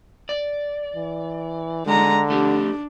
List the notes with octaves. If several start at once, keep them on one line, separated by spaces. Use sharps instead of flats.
D5
E3
D3 G#3 A#5
A3 D4 G4